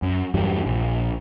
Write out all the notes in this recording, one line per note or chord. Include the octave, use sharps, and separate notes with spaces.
F#2
E2 G2 F#3 G3
A#1